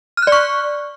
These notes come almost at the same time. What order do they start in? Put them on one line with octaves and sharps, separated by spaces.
F6 F#6 D5 C#6